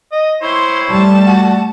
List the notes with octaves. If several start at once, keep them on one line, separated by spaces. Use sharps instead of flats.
D#5
E4 C5 C#5 C6
G3 A3 A5
F#4